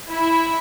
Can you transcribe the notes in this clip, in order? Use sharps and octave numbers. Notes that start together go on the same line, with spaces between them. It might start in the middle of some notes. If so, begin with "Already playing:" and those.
E4